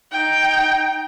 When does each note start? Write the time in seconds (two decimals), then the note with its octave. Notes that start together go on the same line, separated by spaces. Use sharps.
0.12 D#4 G5